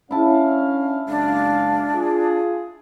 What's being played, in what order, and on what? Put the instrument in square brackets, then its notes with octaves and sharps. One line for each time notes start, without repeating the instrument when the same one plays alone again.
[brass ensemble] C#4 D4 F5 [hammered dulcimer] E4 A5
[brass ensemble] F#1 G#3 F5 [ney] D4
[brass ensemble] F4 G#4